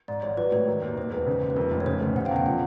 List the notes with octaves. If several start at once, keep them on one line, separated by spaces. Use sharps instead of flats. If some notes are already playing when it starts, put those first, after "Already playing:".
G#2 D5
G#1 C#5
F#3 B4
A2 C#5
D#3
D#2
D#2 C5
E1 B4
C#3
D#2
B4
F2 A#4
F1
C#5
C#3 C5
D2
C#3 F#5
F5 G5
E2
F5 G5
F3 F#5